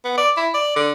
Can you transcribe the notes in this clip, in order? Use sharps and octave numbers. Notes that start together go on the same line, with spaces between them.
B3
D5
E4
D5
D3